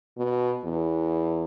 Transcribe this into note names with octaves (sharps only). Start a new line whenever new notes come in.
B2
E2